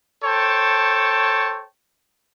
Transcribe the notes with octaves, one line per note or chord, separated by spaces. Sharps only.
A4 C5 C#5 G5 A5